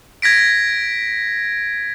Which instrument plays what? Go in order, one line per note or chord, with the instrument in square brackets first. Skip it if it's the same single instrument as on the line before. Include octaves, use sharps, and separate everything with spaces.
[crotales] G#6 A#6 B6 D7